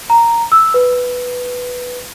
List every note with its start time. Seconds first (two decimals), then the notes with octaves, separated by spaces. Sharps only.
0.10 A#5
0.52 E6
0.74 B4